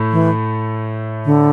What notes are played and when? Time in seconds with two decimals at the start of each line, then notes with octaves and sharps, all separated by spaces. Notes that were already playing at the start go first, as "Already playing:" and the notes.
Already playing: A2 A3
0.12 E3
1.25 D3